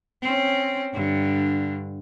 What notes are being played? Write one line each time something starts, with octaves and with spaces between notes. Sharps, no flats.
C4 C#4
G2 D3